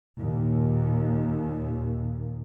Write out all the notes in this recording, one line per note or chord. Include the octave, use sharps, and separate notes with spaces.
D#2 A#2